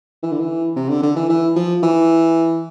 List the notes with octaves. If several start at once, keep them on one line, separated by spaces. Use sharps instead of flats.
E3
D3
E3
C3
D3
D3
E3
E3
F3
E3